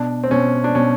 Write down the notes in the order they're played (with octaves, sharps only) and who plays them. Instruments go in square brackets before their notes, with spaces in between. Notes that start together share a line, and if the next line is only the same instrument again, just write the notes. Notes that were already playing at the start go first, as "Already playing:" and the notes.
Already playing: [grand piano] B2 [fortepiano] D4
[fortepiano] C4
[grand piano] B2 [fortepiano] C#4
[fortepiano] D4
[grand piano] B2 [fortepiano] C#4